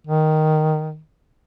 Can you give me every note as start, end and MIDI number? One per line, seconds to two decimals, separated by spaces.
0.07 0.99 51